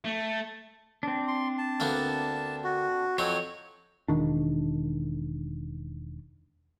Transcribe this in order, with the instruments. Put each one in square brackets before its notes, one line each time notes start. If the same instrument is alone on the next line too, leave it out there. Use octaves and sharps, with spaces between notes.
[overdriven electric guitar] A3
[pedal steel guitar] C4 D4
[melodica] C6
A5
[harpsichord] D2 A#3 B3
[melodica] F#4
[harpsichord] F2 F#3 C4 [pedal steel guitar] C#5
[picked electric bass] E1 D#3 D4